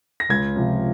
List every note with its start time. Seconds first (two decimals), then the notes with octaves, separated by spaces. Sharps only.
0.20 A#6
0.29 C#2 G#6
0.56 C3 F3